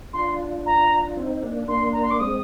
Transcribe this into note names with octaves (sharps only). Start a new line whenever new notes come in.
D4 F4 C6
A#5
C4 D#4
A#3 D4
A#3 D4 C6
A#5
C6
D6
G#3 C4 D#6